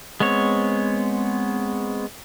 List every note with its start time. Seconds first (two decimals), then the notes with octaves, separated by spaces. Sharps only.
0.20 G#3 B3 C4 C#5